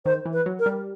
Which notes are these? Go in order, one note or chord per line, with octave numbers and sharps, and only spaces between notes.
D#3 C5
E3
B4
F#3
A#4
G3